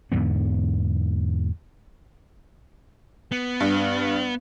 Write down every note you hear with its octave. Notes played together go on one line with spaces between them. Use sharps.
E2 G#2 D3 B3
B3
G2